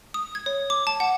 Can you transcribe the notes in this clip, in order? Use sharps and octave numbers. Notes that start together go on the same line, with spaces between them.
D#6
G#6
C#5
D6
A5
F#5